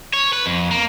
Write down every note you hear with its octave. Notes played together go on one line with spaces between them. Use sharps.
C#5
B4
F2
A#3